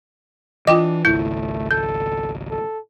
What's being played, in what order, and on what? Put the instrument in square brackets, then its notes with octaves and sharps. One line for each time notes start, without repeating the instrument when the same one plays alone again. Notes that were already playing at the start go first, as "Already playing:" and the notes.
[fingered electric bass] E3 [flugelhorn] D4 [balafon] F4 G5 D6 [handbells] D#5
[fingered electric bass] G#1 C#2 [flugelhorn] A3 [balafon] E4 [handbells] G6
[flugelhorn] A4 [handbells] G6
[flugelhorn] A4